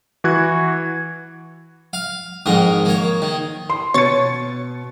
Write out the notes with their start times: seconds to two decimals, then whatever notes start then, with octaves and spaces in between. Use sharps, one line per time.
0.24 E3 F#4 F#6 G#6
1.93 F5
2.46 F2 G#2 D#3 A#4
2.85 A#3 C#5
3.22 D#3
3.70 C6
3.94 B2 C#5 A6 C#7